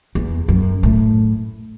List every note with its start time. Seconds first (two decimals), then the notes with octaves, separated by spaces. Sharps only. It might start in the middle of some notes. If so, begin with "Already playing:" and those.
0.15 E2
0.48 F#2
0.83 A2